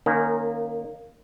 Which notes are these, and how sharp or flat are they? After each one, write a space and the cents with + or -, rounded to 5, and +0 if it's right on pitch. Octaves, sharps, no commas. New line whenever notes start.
D#3 -25 A#3 +0 C#4 +0